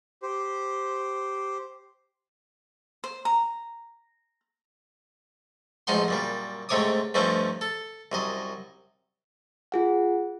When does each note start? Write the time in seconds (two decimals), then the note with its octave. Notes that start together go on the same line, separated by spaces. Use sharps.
0.23 G4 C5
3.04 C5
3.25 A#5
5.87 A1 F3 G#3 D#4 F#5 C6
6.08 F#2 A#2 G3
6.69 G#2 C3 A3 C#5 D6 D#6
7.14 G2 F3 A3 C4 C#4 D#4
7.61 A4
8.12 C2 F#2 D#5
9.72 F4 G#4 F#5